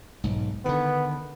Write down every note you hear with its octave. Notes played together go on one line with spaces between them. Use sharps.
B1 G#2
D3 D#3 B3